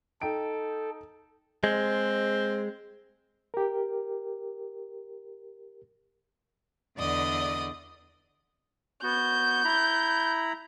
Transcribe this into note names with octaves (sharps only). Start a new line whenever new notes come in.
D#4 A4 G5 D7
G#3 C4
G4 A#4
E2 D3 D5 D#5 D#6
B3 F#4 G6
E4 A#5 B5